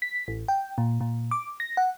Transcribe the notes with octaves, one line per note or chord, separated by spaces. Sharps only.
B6
A1
G5
A#2
A#2
D6
A#6
F#5